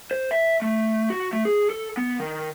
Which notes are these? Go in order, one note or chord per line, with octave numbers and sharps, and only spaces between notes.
C5
E5
A3
F#4
A3
G#4
A4
B3
D#3